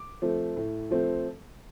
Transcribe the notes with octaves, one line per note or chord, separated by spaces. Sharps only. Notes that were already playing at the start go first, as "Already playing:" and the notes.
Already playing: D6
F3 A3 C4
A2
F3 A3 C4